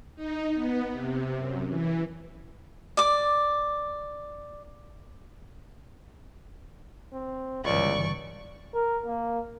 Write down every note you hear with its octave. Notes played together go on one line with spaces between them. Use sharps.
D#4
B3
C3
F#2
E3
D5 D6
C4
G1 C#2 C#3 E3 D5 C#6
A#4
A#3